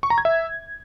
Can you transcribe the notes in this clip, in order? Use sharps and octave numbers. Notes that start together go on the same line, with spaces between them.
C#6
A#5
G#6
E5